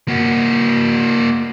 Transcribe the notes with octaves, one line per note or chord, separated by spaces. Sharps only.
A#3 F#4